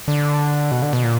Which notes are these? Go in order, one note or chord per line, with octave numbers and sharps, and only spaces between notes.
D3
B2
D3
B2
A#2